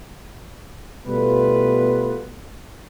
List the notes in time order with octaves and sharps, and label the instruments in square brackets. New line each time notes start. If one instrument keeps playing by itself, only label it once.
[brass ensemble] B2 G3 A3 B3 F4 B4